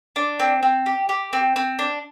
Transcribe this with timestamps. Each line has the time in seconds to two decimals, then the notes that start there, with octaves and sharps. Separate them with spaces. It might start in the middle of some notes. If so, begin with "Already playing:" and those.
0.16 D4
0.40 C4
0.63 C4
0.86 G4
1.09 G4
1.33 C4
1.56 C4
1.79 D4